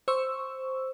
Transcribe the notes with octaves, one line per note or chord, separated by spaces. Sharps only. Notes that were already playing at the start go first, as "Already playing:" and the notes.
C5 C#6 E6